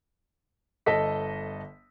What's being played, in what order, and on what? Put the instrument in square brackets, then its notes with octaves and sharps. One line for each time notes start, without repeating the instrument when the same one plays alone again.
[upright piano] G1 A4 D#5 B6